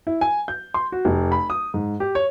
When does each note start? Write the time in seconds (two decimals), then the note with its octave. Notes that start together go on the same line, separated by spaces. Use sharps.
0.07 E4
0.21 G#5
0.48 G6
0.74 C6
0.92 F#4
1.05 F1
1.32 B5
1.50 D#6
1.74 G#2
2.00 G4
2.15 C#5